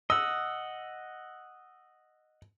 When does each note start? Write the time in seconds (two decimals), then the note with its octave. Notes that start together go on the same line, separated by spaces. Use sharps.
0.10 D#5 F#5 E6